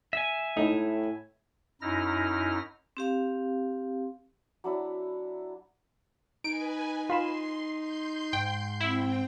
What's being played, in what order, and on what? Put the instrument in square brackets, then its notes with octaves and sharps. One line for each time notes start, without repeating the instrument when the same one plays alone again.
[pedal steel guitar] E5 G#5
[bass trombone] A2 [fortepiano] D#4
[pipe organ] F#2 D#4 E4 F6 A#6
[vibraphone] C4 G4 F5
[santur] F#3 D4 E4
[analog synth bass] D#4 [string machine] B4 G#5 [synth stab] D7
[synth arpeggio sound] F4 B5 E7 [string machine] C6
[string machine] C6 G6
[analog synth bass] G#2 [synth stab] G5
[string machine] C4 G5 [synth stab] E4